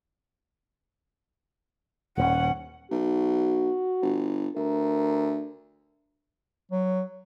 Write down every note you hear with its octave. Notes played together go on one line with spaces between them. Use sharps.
D#1 C#4 F#5
B1 F#4
G1
D2 A#4
F#3